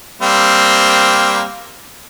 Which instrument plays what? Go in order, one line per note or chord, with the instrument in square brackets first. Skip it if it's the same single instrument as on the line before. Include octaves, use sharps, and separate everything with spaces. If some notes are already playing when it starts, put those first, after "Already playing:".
[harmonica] G3 A#3 C4